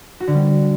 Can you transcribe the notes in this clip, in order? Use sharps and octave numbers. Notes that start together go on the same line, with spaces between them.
F#4
D3
G3